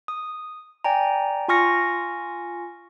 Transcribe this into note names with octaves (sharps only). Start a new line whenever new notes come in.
D#6
D5 G5 G#5 A#5
F4 G#5 C#6 F6 A#6 C#7